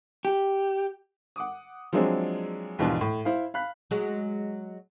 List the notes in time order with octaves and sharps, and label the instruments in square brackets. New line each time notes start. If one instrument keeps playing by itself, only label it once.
[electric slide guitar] G4
[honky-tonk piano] F#5 D6 D#6
F3 F#3 G#3 C4 D4 G#4
D#2 G#2 B2 E3 F3 D4
A2
E4 C5 F5
F5 B5 F#6 B6
[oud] F#3 G#3